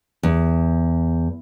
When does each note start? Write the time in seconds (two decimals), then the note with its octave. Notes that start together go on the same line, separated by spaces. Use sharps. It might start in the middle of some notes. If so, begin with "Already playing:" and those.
0.23 E2